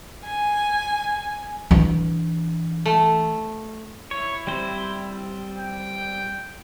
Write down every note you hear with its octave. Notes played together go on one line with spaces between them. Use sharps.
G#5
E3 D4
A3
E4 C#5
G3 C4 C5
G5